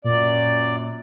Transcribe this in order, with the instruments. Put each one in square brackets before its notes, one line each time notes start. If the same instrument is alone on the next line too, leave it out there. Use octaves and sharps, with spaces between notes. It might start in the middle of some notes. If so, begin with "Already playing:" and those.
[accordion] F#2 D5 [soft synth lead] A#2